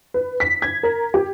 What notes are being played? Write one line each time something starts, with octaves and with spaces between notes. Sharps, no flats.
B4
B6
G#6
A#4
G4